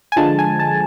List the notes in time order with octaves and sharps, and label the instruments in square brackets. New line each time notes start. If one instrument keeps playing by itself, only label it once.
[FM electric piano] G#5
D3 F3 G#3 A5
G#5
A5